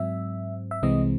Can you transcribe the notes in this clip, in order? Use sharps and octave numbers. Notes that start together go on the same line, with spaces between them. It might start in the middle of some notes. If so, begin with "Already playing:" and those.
Already playing: G#2 F#3 C4 E5
E5
C2 C3 E3 G#3 C4 D#5